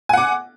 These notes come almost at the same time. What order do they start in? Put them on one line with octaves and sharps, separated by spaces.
G#5 F#5 D6